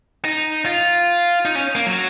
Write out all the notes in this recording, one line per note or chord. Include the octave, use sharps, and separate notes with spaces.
D#4
F4
D#4
C#4
A#3
F#3